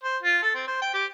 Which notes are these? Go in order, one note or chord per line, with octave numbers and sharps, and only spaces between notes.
C5
F4
A4
C4
C5
G5
G4